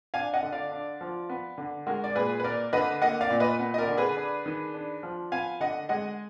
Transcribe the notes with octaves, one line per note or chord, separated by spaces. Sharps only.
D4 F5 G#5
D#5 F#5
D3
D5 F5
D4
F3
B3
D3
G#3 F#4 A#4
D5
A#2 G#4 B4
B4
A#3 A#4 D5
D3 B4 D#5
A#3 D#5 F#5
D5 F5
A#2
B4 D#5
B3
D#5
A#4 D5
D3
G#4 B4
D4
D#3
D4
F3
B3 F5 G#5
D3 D#5 F#5
G#3 D#5 F#5